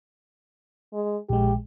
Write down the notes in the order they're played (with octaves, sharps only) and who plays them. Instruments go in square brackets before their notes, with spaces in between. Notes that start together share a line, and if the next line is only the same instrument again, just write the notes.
[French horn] G#3
[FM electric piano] A#1 G#3 [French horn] G4